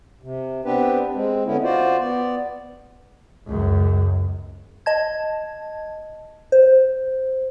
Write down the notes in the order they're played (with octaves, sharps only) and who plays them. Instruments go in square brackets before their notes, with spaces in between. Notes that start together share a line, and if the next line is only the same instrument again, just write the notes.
[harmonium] C3
B3 C4 D4 G4 B4
G#3 C4
D3 B3 C#4 E4
F4 F#4 C5 D5
B3 D5
[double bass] C#2 F#2
[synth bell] D#5 A5 G#6
C5